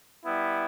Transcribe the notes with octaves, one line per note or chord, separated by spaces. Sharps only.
G3 B3 E4